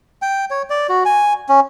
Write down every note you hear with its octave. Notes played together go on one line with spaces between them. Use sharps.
G5
C#5
D5
F#4
G#5
C#4